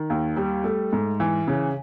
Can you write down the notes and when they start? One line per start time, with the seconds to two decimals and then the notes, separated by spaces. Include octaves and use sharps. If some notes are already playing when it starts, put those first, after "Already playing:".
Already playing: D#3
0.10 D#2
0.37 G3
0.64 A3
0.93 G#2
1.20 E3
1.47 C#3